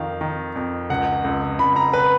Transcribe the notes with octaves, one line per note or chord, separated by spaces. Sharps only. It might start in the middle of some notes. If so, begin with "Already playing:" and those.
Already playing: F2 D#3 F5
D#3
F2
C#2 F#5
C#2
C#2 B5
A#5
B4